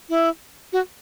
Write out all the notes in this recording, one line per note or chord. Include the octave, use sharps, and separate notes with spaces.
E4
F#4